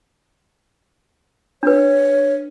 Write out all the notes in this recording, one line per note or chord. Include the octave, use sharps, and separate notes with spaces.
D4 B4 C#5